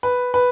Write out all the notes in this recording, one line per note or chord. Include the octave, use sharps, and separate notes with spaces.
B4
B4